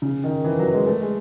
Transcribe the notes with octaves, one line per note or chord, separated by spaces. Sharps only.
C#3
D#3
E3
F#3
G#3
A3
G#3